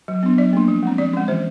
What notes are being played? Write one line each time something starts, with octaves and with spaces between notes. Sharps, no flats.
F#3
B3 D4
F#3 D5
A#3 D4
F3
G#3 C4
F3 D5
G#3 C#4
E3 C5